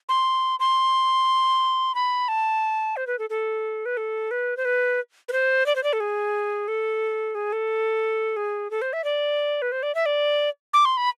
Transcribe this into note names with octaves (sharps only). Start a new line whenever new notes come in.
C6
C6
B5
A5
C5
B4
A4
A4
B4
A4
B4
C5
B4
B4
C5
D5
C5
D5
A4
G#4
A4
G#4
A4
G#4
A4
C5
E5
D5
B4
C5
D5
E5
D5
D6
C6
B5